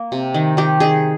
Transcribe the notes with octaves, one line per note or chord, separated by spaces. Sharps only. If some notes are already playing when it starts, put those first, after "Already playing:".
Already playing: A#3
C3
D#3
D#3 G4
D#3 G#4